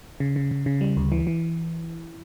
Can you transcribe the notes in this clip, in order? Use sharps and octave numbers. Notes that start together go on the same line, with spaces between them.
C#3
C#3
C#3
C#3
G3
D2
E3
E3